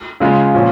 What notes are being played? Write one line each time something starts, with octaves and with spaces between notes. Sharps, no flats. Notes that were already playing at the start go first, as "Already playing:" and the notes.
C#3 G#3 F4
A#2 F3 C#4